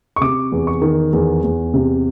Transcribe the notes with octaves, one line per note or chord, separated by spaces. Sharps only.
C#6
C3 D6
E2
C#6
D#3
E2
E2
C3